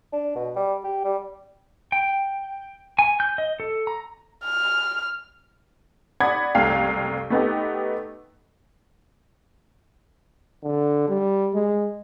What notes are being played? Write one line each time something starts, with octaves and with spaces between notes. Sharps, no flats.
D4
B2
G3
G4
G3
G5
G#5
G6
D#5
A4
A#5
F6
D5 F#5 B5 D#6 G#6
F#1 C2 A3 F5 G5
A3 B3 D#4 G4
D3
G3
G#3